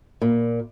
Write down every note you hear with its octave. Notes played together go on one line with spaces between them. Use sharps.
A#2